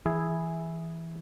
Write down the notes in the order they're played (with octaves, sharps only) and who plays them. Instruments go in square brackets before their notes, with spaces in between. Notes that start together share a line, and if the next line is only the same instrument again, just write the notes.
[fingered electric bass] E3 [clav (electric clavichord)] E4 G#4